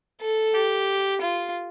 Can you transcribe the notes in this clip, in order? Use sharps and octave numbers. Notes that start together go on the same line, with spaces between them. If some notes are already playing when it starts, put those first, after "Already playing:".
A4
G4
F4